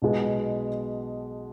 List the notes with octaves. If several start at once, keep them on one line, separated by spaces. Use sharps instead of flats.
B1 B2 G#3